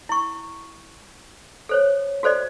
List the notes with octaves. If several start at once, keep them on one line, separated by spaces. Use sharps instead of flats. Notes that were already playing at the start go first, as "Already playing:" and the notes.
E4 C#6
A4 C5 C#5
F#4 A4 C5 D5 D#5